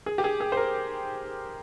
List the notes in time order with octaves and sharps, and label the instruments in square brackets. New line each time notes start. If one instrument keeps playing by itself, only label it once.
[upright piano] G#4
G4
G#4
G#4
C5
A#4